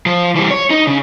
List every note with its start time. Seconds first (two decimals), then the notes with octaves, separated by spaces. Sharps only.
0.06 F3
0.36 E3 G3
0.51 C#5
0.70 D#4
0.87 C#3